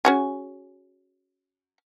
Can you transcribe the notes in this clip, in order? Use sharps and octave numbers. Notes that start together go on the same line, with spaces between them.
C#4 F#4 G#4